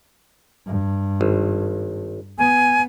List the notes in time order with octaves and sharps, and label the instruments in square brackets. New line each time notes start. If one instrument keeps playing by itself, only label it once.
[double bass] G2
[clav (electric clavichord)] G#1
[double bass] B3 [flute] G#5